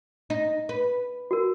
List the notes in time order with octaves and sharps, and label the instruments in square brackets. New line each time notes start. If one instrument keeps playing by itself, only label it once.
[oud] D#4
B4
[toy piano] F#4 A#4